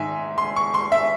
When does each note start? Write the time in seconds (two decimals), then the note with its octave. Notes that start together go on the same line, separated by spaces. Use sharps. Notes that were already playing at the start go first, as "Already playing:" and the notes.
Already playing: G#2 D#3 E5 G#5
0.38 C6
0.56 C#6
0.74 C6
0.92 E5